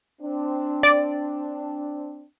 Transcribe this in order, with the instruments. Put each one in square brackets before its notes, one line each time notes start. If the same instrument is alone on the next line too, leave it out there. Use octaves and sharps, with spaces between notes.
[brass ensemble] C4 D4
[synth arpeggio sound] D5